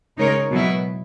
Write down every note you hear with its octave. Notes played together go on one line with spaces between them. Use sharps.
C#3 G#3 D#4 A#4 C#5
B2 F#3 B3 E4